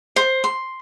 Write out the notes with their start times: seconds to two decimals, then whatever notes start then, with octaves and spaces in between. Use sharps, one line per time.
0.16 C5
0.44 C6